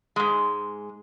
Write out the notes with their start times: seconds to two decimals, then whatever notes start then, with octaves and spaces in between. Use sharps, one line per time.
0.16 G#2 G#3